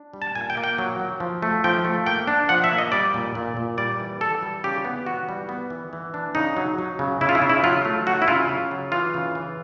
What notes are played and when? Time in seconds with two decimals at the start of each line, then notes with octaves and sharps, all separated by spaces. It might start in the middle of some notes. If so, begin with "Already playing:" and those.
Already playing: D4
0.13 G3
0.22 A5
0.35 A#2 G#5
0.50 G5
0.57 A#3
0.64 G5
0.78 F#3
1.00 F#3
1.20 F3
1.42 A3
1.64 F3 G5
1.85 A3
2.06 A#3 G5
2.27 D4
2.49 F3 F#5
2.64 E5
2.71 A#3
2.78 D#5
2.92 G3 D5
3.14 A#2
3.35 A#2
3.57 A#2
3.78 G3 D5
4.00 E3
4.21 E3 A4
4.42 G3
4.64 C#3 G4
4.85 B3
5.06 E3 F#4
5.29 G3
5.49 B3
5.70 E3
5.93 E3
6.14 D4
6.35 C#3 D#4
6.57 F#3
6.79 F#3
6.99 C#3
7.21 C#3 E4
7.29 F4
7.35 E4
7.42 C#3
7.49 E4
7.64 F#3 F4
7.85 A3
8.07 F#3 F#4
8.22 E4
8.28 C#3 F4
8.49 C#3
8.71 F#3
8.92 E3 F4
9.14 C#3
9.35 E3